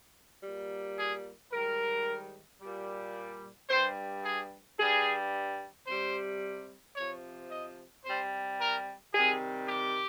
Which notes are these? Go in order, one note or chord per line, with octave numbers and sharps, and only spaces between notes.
A#2 G3
G#4
G#2 D#3 G3 A#4
A#2 G3
G2 G3 C5
G#4
G2 G3 G#4
C3 G3 C5
C3 F3 C#5
D#5
C3 G3 C5
A#4
C3 D#3 G3 G#4
G4